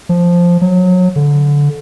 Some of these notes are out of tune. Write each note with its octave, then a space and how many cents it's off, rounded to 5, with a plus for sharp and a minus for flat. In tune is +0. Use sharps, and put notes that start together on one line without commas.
F3 +0
F#3 -25
D3 -20